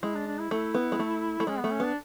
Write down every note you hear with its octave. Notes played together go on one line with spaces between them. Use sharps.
G#3 E4
D4
D4
E4
A3 E4
B3
G#3
A3
A3
G#3 C#4
A3 B3
C#4
B3 D4